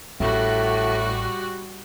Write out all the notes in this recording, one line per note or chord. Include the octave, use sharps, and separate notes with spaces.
A1 A2 G3 F#4